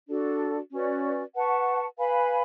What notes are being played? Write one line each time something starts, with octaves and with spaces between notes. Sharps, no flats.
D4 F#4 A4 D5
C#4 F#4 B4 D5
B4 F#5 A5 C#6
B4 F5 G#5 B5